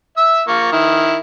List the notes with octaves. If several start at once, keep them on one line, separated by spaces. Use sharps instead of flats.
E5 E6
A#3 F4 C#6
D#3 E4